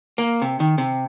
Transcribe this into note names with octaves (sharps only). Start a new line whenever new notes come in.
A#3
C3
D#3
C3